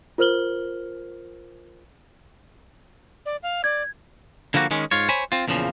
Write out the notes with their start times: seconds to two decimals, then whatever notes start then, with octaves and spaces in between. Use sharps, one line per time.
0.18 F4 A#4 C5 F6 F#7 G7
3.26 D5
3.43 F5
3.64 D5 G#6
4.54 D3 F3 G3 A#3 F#4
4.71 D#3 G#3 C#4
4.91 G#2 F4 C#5
5.09 C5 C#5 G#5 B5
5.32 C4 F4
5.48 E2 A#2 C#3 F3